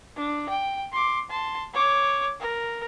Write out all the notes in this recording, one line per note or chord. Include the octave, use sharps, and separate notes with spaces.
D4
G5
C6 D6
A5 C6
C#5 D6
A#4